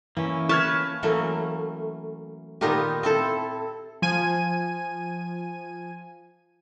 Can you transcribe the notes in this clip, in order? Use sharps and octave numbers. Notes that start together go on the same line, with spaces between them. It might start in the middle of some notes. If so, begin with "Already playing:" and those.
E3 A#3 C#4
B4 A5 C#6 F6 G#6
E3 F#3 A3 A#3 C#4
A#2 D#3 B3 D#4 F4 G4
C4 E4 A4
F3 G#5 D#7